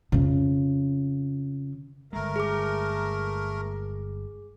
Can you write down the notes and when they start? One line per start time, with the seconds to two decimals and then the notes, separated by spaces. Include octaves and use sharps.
0.12 F2 C#3
2.13 G1 G#3 A3 A#4
2.36 G#4 D6